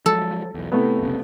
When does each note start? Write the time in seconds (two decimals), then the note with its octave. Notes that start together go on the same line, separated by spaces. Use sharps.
0.06 F3 F#3 G#3 A4
0.54 B1 E2
0.72 A2 C3 A3 B3
0.99 F1 B1 C#3